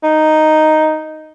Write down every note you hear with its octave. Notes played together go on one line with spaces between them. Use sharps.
D#4